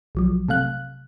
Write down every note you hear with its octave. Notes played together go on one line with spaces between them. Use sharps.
B1 F3 F#3
C3 A3 F5 F#6